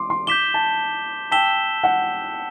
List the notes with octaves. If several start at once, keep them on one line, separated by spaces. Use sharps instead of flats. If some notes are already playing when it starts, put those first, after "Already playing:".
Already playing: C6 D6
C6
D6 G6 B6 E7 G7
A5
G5 A5 E6 B6 E7 G7
F#5